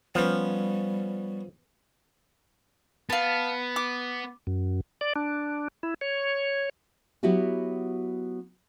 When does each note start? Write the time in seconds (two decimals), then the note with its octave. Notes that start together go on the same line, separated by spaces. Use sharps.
0.15 F3 G3 B3 C#4
3.10 B3 F5 A5
3.76 D6
4.47 F#2
5.01 D5
5.16 D4
5.83 E4
6.01 C#5
7.23 F#3 B3 E4 F#4 G4